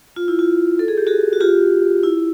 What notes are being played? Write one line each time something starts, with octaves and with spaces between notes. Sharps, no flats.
F4
E4
F4
A4
G#4
G4
F#4 G#4
F#4
F4 G4
E4